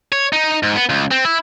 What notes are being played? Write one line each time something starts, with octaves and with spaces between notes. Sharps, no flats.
C#5
D#4
G#2
B3
C#2
C4
E4